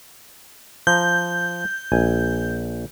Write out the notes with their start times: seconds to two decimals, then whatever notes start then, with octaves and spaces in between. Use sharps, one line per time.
0.87 F3 A#5 G6
1.92 A#1 G#5